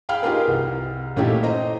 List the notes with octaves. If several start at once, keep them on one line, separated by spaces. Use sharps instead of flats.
G#4 F5 G5 B5 F6
D#4 F4 G4 G#4 A#4 B4
C2
A#2 A3 C#4 D#4 E4 G4
C5 D#5 A#5